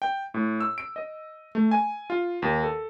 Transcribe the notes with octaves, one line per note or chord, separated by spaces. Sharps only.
G5
A2
E6
D7
D#5
A3
G#5
F4
D#2
A4